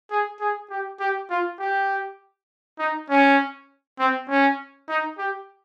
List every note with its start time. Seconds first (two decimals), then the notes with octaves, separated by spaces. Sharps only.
0.11 G#4
0.40 G#4
0.70 G4
1.00 G4
1.30 F4
1.59 G4
2.79 D#4
3.10 C#4
3.99 C4
4.29 C#4
4.89 D#4
5.18 G4